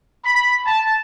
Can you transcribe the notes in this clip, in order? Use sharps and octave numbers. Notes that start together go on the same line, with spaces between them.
B5
A5